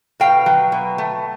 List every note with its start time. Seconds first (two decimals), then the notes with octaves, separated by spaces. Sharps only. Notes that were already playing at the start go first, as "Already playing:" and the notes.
0.20 B2 F5 G5
0.46 F#3
0.72 B2
0.98 A3